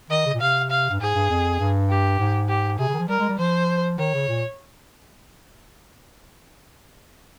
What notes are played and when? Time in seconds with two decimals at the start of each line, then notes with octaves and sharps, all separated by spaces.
0.10 D#3 D#5
0.26 C#3
0.34 A#2
0.41 C3 F5
0.70 F5
0.90 G2
1.00 G#2 G#4
1.15 G2
1.30 F2
1.60 G2
1.90 G4
2.19 G#2
2.49 G4
2.79 C3 G#4
2.89 C#3
2.94 D#3
2.99 F3
3.08 G3 A#4
3.20 G#3
3.29 G3
3.39 F3 C5
3.98 D#3 C#5
4.14 C#3
4.28 A#2